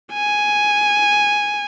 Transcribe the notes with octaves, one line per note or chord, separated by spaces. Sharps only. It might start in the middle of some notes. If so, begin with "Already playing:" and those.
G#5